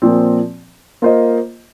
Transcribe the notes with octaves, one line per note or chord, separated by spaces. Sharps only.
A#2 F3 C4
A#3 F4 C5 D#5